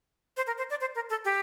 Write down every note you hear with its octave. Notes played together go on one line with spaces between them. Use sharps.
C5
A#4
C5
D5
C5
A#4
A4
G4